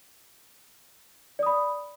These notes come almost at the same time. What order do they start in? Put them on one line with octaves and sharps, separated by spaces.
D5 D#6 B5